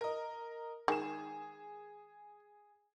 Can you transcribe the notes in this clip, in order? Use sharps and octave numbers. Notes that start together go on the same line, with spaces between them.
A#4 D#5
D#3 G#3 G#4 E7